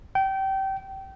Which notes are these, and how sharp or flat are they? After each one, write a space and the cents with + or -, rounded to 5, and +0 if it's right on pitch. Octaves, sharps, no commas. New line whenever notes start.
G5 -25